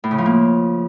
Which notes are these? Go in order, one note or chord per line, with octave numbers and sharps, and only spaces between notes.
A2
C#3
F3
A#3